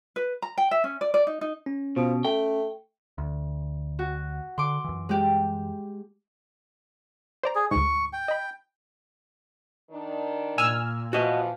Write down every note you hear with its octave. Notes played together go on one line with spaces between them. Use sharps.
B4
A#5
G5
E5
C#4
D5
D5
D#4
D#4
C#4
B2 F3
A3 G5
D2
F#4
D3 C6 D6
F#2 E3
G#3 G4
C5 D5 A#5
G#4
D2 G#2 C#6
G5
D#5 B5
D#3 D4
A#2 G#5 E6 F6
E3 F3 F#4 D#5